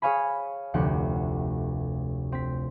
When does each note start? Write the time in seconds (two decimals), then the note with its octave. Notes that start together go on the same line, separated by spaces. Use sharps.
0.02 G#4 C#5 F5 G#5 B5
0.74 F1 D2 C3 G4 F#5
2.32 C4 B6